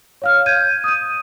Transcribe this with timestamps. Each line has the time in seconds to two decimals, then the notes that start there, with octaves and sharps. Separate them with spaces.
0.22 C#5 F5 F6
0.46 G6 G#6 D#7
0.84 D#6 D#7